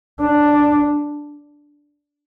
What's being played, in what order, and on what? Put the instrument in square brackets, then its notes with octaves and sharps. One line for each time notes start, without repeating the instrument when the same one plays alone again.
[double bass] D4